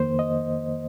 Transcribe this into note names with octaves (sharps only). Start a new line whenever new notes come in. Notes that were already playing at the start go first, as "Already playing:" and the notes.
Already playing: F2 D#3 A#3 C5
D#5